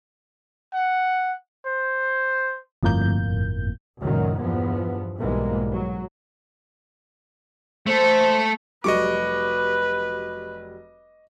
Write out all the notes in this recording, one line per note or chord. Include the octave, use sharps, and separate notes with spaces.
F#5
C5
G1 F2 A2 A#3 G6
C#2 F#2 A#2 D#3 F#3
E2 G2 F3 B3
B1 G#2 E3 G3 G#3 A#3
F#3
A3 A4 C5
F1 F#3 G3 B4 D#5 C#6 D6